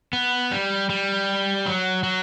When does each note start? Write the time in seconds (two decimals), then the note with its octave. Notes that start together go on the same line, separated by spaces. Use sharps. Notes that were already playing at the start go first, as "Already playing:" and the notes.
0.13 B3
0.51 G3
0.90 G3
1.66 F#3
2.04 F#3